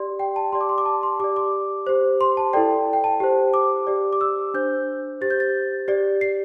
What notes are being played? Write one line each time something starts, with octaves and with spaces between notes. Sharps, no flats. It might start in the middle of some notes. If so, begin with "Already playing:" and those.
Already playing: G4 D5 C6
G5
A5
G4 D5 C6
D6
C6
D6
A5
C6
G4 D5 D6
D6
G4 C5
C6
A5
E4 A4 D5 G5
G5
A5
G4 C5
D6
G4 D5
D6
E6
D4 C5 G6
G4 C5 A6
G6
A6
G4 D5
C7